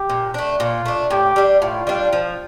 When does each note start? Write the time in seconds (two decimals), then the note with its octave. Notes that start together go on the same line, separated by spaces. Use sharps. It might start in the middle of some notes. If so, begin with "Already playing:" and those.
Already playing: G4
0.09 A#2
0.34 A3 D4
0.60 A#2 F4
0.86 A3 D4
1.10 A2 G4
1.36 G3 D4
1.61 A2 F4
1.87 G3 D4
2.13 F3